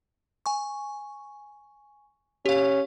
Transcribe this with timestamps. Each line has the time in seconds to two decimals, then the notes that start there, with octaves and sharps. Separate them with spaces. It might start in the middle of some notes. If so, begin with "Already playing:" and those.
0.46 G#5 C#6
2.46 C#4 G4 F5